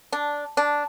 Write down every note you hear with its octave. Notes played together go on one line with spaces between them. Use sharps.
D4
D4